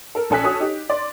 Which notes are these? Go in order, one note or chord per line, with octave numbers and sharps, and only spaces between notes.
A4 A#4
A#1 C#4 A4 G#5 F#6 B6
F#4 A4 C#5 D#6
D#4 G4
D5 C6